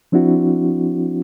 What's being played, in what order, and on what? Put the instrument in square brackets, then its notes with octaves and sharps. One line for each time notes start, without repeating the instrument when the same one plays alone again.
[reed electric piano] F3 C4 D4 E4 F#4